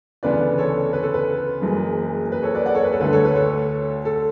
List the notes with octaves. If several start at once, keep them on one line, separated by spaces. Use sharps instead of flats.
D2 C#3 E3 B3 D4 B4 D5
A4 C#5
B4
A4
B4
F#1 F#2 E3 G#3
B4
A4 C#5
B4 D5
D5 F#5
A4 C#5
B4
A4
D2 D3 A3 B4
A4 C#5
B4
A4 C#5
A4